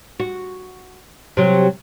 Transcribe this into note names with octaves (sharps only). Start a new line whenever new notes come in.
F#4
C3 F#3